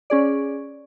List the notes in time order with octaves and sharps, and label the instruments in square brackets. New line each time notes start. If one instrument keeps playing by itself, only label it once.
[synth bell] C#4 G#4 D5